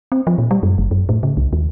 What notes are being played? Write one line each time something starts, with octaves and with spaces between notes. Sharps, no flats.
C4
F3
A#2
G3
F#2
G1
F#2
A2
C#3
C2
D#2